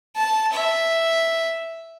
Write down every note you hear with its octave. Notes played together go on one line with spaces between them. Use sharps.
A5
E5